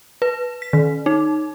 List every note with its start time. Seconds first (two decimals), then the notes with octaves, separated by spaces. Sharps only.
0.22 B4
0.62 B6
0.73 D#3
1.06 D#4